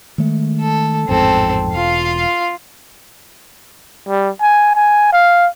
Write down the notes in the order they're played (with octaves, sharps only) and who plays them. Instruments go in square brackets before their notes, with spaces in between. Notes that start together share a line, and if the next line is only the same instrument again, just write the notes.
[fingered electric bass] D#3 G#3 A3
[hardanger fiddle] A4
[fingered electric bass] A1 F2 G#2 [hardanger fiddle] C4 A4
[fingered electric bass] E1 [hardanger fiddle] F4 F5
[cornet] G3
G#5
G#5
F5